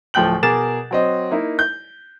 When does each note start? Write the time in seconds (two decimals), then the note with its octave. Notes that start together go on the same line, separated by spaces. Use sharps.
0.14 D1 F3 A3 G5 G6 F#7
0.43 B2 G#4 A#4 D6 A6 E7
0.91 F#3 C4 D#5
1.31 A#3 D#4 E4
1.59 G6